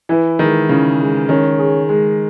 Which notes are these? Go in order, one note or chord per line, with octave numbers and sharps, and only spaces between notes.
E3 E4
D#3 G#3
C#3 E4
G#3
D#3 C#4
G#4
G#3